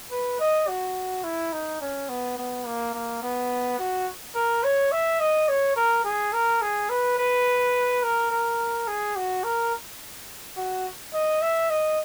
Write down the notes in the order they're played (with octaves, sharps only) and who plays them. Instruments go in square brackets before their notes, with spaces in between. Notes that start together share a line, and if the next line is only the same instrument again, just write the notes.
[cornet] B4
D#5
F#4
E4
D#4
C#4
B3
B3
A#3
A#3
B3
F#4
A#4
C#5
E5
D#5
C#5
A#4
G#4
A#4
G#4
B4
B4
A#4
A#4
G#4
F#4
A#4
F#4
D#5
E5
D#5